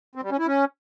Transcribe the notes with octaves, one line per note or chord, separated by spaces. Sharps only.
C4
G3
C#4
E4
C#4